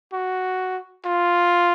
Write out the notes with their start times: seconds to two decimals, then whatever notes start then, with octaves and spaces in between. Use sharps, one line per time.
0.13 F#4
1.06 F4